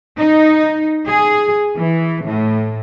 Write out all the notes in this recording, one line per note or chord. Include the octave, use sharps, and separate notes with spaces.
D#4
G#4
E3
A2